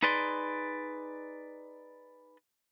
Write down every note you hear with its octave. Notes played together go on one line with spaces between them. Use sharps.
D#4 G#4 B4 D5 C6